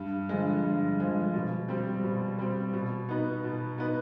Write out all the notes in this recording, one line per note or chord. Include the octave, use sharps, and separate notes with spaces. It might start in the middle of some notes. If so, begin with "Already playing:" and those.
Already playing: G2
D3 F3 G#3
G2
D3 F3 G#3
B2
G3 C4
B2
G3 C4
B2
B3 D#4 B4
B2
B3 D#4 B4